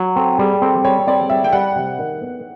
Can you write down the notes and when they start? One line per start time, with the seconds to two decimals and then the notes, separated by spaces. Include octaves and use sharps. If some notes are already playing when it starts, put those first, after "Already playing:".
Already playing: F#3
0.16 C4 A4
0.39 G3 G#4
0.62 C4 A4
0.84 G3 C#5
1.07 C4 D5
1.30 G3 E5
1.44 G5
1.53 G3 F#5
1.76 C3
1.99 D#3
2.21 B3